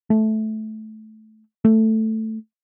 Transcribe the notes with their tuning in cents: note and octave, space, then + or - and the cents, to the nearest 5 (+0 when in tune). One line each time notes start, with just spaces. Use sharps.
A3 -15
A3 +5